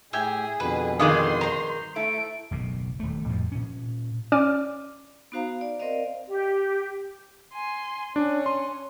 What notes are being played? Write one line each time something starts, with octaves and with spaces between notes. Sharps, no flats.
A2 G4 G#4 E5 G#5
F2 B2 D3 B4
G2 D#3 G#3 D5 C6 D6 D#6
C5 A#5
A3 E4 A4 D7
F#1 B1 B2
D#1 A3
F2 A2 F3
A#2 C#4
C#4 D5 D6 F6 D#7
B3 D#4 F#4 C5 F5 A#5
D5
C4 A#4 C5 D5 D#5 F5
G4
G#5 C6
C#4 D4
C6